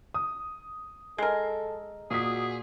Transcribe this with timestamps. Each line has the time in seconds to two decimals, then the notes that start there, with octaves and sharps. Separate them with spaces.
0.14 D#6
1.18 G#3 A4 A#4
2.11 A#2 F#4 G#4 D#6 B6